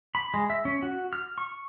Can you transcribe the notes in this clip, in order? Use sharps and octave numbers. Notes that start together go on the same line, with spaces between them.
B5
G#3
E5
C#4
F#4
F6
C#6